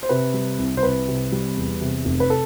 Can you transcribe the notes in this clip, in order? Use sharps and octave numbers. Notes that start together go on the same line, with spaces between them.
C5
C3 B4
G3
C2
C5
C2 B4
C3
G3
E2
C3
F1
B4
A4